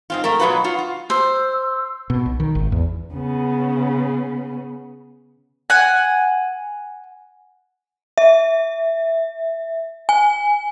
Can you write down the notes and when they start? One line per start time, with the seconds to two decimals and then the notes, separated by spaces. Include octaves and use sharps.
0.10 G#2 C4 F4
0.24 A3 A4 A#4
0.39 B2 F#3 G#3 F4 F#4 B4
0.64 F4 F#4
0.79 F4
1.10 C5 E6
2.10 B2
2.26 B1
2.40 D#3
2.55 G#1
2.72 E2
3.14 C#3 B3
5.70 F#5 G#5
8.18 E5
10.09 G#5